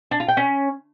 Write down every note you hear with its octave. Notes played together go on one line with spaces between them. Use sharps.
D4
F4
G5
C#4